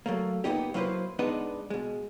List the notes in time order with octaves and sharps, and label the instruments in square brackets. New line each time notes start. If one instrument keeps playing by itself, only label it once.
[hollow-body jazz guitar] F#3 A3 A#3
A#2 E3 A#3 B3 D#4 G4
F#3 A#3 B3 E4 B4 C5
G#3 B3 D4 D#4 B4 D#5
B2 G#3